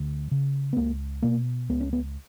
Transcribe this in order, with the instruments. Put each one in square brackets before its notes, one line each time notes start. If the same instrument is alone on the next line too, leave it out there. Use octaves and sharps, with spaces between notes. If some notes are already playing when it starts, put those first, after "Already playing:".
Already playing: [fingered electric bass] D2
C#3
B3
C#2 A#3
B2 A#3
C#2 B3
C#4
B3